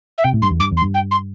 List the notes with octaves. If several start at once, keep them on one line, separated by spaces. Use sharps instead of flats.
E5
C3 G5
A2
G2 C6
E2
G2 D6
E2
C6
G2
G5
C6